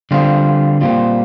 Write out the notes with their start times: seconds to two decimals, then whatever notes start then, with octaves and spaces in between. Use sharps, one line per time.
0.11 D3 G3 C4 F4
0.81 A#2 G3 C4 F4